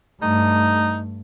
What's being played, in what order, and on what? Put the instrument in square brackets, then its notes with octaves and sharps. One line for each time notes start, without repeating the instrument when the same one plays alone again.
[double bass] G2 A3 [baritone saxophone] D#4